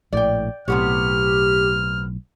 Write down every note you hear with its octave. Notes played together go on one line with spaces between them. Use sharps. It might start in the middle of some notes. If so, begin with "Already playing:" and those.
A#1 A2 D5 G5
B1 A2 C3 B3 G4 C#5 F6